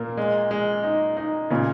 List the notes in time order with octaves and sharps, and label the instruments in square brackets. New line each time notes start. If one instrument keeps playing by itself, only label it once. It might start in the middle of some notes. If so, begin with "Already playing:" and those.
Already playing: [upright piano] A#2 [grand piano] A#3
[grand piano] G#3
G#3
D#4
D#4
[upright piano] A#2 [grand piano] C#3